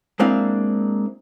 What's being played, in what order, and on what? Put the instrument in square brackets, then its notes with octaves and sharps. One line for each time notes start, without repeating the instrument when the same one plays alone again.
[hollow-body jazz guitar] G#3 A#3 C4 D4 E4 F5